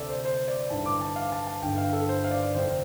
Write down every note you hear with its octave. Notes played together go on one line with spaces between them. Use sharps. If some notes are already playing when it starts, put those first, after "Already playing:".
Already playing: D2 C3 A4 D5
C5
C5
D5
A1 G2 D3 A5
D6
A5
F5
A5
A5
G1 G2 D3 G5
F5
A4
C5
F5
D5
F1 F2 D3 C5